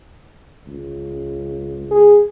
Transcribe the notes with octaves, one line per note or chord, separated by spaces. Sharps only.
C#2
G#4